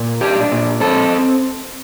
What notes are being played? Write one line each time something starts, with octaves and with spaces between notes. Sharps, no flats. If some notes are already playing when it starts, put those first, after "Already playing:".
Already playing: A#2
D4 G4
A#2
C4 A4